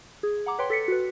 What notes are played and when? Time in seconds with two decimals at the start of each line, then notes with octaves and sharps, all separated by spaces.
0.23 G#4
0.46 F#5 A#5 D6
0.59 B4 C#5 G5 C6
0.70 A4 B6 C#7
0.88 F#4 B4